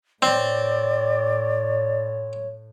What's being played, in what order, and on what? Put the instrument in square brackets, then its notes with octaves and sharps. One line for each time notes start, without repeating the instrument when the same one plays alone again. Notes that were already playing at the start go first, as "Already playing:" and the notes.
[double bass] A2 [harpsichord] C4 [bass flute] C#5 [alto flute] D5